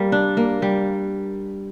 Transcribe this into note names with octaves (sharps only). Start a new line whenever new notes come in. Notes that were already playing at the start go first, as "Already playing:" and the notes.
Already playing: G3 A#3
D4
A#3
G3